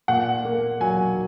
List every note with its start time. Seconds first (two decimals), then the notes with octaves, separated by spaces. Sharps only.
0.08 A#2 F#5
0.45 A#3
0.81 F#3 G#5